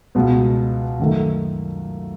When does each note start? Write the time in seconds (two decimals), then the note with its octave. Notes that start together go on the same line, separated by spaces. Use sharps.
0.15 C#2 B2 G#3 B3
0.99 F#2 D#3 A3